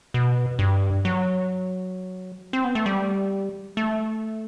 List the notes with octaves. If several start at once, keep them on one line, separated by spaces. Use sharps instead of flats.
B2
G2
F#3
C4
B3
A3
G3
A3